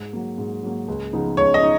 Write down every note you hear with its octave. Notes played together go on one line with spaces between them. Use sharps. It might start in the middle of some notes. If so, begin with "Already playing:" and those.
Already playing: G#2
F#3 A#3
G#2
F#3 A#3
C#2
C#3 F3 B3 D#4
C#2 C#5
D#5
D#4